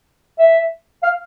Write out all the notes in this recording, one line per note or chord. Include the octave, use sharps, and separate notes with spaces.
E5
F5